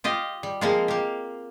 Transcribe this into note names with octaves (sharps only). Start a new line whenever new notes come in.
F4 G4 D#5
G3
F3 G#3 A#3 C4 F4
A#3 G4